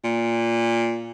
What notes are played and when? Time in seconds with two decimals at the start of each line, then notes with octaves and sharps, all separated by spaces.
0.04 A#2